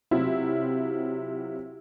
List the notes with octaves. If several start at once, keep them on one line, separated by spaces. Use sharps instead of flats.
C3 F#3 C4 E4 F4